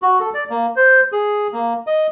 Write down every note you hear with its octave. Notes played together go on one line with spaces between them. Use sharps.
F#4
A4
D5
A#3
C5
G#4
A#3
D#5